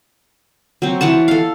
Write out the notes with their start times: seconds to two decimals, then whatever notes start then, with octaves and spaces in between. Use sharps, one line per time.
0.82 F#3 C4
1.01 E3 C#5 F#5 A5
1.28 A4 F5